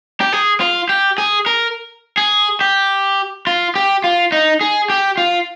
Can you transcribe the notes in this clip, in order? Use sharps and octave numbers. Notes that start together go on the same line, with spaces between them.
G4
G#4
F4
G4
G#4
A#4
G#4
G4
F4
G4
F4
D#4
G#4
G4
F4